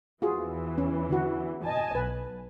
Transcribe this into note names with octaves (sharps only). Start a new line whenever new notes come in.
E2 E3 F4 F#4 G#4
C#4
D3 E4 F#4
D#5 G#5 A5
B1 B4